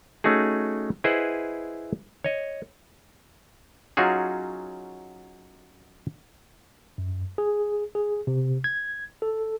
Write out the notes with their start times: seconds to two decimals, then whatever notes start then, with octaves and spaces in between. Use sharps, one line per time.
0.24 A3 C#4 D#4 F#4 G#4
1.04 E4 G#4 B4 C5 D#5 F#5
2.24 C#5 D#5
3.97 F#3 C#4 D#4 F4 F#4 G#4
6.98 F#2
7.38 G#4
7.95 G#4
8.27 C3
8.64 G#6
9.22 A4